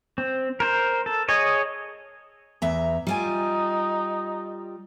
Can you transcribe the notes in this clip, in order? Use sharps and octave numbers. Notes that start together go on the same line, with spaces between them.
C4
A#4 C5
A4
G#4 C#5 D#5
E2 E5 A#5
G3 D#4 F4 G#5